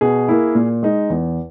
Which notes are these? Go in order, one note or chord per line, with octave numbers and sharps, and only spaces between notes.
B2 G#4
A#3 E4
A#2
G#3 D#4
E2